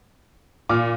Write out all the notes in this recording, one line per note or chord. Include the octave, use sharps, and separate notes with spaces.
A#2 D6 F6